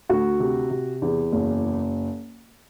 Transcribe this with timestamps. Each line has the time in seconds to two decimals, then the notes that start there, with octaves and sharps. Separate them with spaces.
0.09 D2 F#4
0.40 C3
0.70 C3
1.02 E2
1.32 F#1